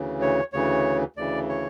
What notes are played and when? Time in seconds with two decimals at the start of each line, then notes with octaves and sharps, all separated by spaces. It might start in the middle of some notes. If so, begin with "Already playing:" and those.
Already playing: D2 C#3 E3
0.22 C#5
0.53 D2 C#3 E3 C#5
1.16 D2 C#3 E3 D5
1.49 C#5